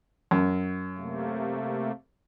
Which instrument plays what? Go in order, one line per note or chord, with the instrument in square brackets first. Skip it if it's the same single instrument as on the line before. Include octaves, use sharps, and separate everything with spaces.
[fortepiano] F#2
[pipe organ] C3 A3 A#3